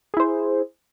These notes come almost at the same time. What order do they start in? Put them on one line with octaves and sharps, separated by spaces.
G#4 E4 C5